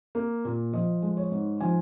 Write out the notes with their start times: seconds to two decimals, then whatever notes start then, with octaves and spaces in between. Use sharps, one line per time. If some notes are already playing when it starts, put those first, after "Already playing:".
0.15 A#3
0.45 A#2
0.73 F3 D#5
1.02 G#3
1.17 C#5
1.32 G#2
1.61 F3 G#5